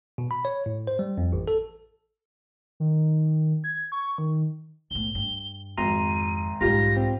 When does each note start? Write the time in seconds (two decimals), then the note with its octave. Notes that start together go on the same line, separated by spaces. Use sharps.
0.18 B2
0.31 B5
0.45 C#5
0.66 A2
0.87 C5
0.99 G3
1.18 F2
1.33 A1
1.48 A4
2.80 D#3
3.64 G#6
3.92 C#6
4.18 D#3
4.91 B1 A2 G7
5.15 G2
5.78 G#1 F2 A#5 C6 D#7
6.61 B1 G#2 G3 F4 G4 A#6
6.97 C4